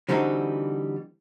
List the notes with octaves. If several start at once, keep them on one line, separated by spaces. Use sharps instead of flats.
D3 E3 G3 C4 D#4 F#4